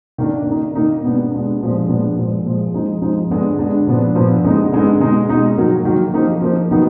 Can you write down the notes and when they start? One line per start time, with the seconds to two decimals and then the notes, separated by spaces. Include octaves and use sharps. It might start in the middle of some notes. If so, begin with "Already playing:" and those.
0.18 D#3 A#3 D4
0.47 D#3 A#3 D#4
0.75 D#3 A#3 D#4
1.04 B2 G#3 B3 D4
1.31 B2 G#3 B3 D4
1.61 A#2 F3 G#3 B3 D4
1.88 A#2 F3 G#3 B3 D4
2.17 A#2 F3 G#3
2.46 A#2 F3 G#3
2.74 F3 G#3 D#4
3.02 F3 G#3 D#4
3.30 D3 G#3 B3 D4
3.59 D3 G#3 B3 D4
3.87 A#2 F3 B3 D4
4.15 A#2 F3 B3 D4
4.44 D3 G#3 B3 D#4
4.72 D3 G#3 B3 D#4
5.00 B2 G#3 D#4
5.29 B2 G#3 D#4
5.58 D#3 F#3 A#3
5.85 D#3 F#3 A#3
6.14 F3 A#3 D#4
6.42 F3 A#3 D#4
6.71 D#3 F#3 B3 D#4